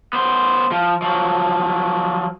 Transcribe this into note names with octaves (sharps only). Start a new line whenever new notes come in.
B3 C5
F3
F3 F#3